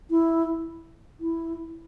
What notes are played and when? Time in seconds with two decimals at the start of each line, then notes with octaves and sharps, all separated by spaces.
0.10 E4
1.20 E4